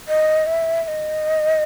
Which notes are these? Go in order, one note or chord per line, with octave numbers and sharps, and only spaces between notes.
D#5
E5
E5
D#5